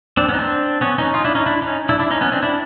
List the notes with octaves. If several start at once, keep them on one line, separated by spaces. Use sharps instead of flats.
C4 D4
B3 C#4
D#4
C4 D4
B3 C#4
C#4 D#4
D#4 F4
D4 E4
C#4 D#4
D4 E4
C#4 D#4
D4 E4
D4 E4
C#4 D#4
B3 C#4
C4 D4
D4 E4